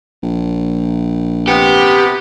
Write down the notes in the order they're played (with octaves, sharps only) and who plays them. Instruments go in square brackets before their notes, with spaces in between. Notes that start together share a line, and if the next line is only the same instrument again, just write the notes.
[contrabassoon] A#1
[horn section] C3 B3 [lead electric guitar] G4